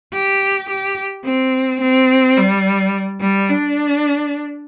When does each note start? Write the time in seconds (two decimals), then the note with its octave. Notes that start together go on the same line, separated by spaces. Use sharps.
0.13 G4
0.69 G4
1.25 C4
1.81 C4
2.37 G3
3.21 G3
3.49 D4